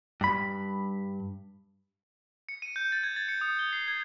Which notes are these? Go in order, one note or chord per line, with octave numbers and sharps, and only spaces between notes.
G2 B5
C#7
D#7
G6
A6
G#6
A6
C#7
D#6
G7
C7
G#6